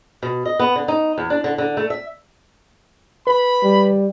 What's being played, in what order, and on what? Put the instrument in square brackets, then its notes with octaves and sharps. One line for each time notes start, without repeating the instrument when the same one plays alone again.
[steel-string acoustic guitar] B2
D#5
B3
D3
D#4
E2
D4
D3
D3
A3
E5
[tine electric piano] B4 [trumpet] B5
[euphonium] G3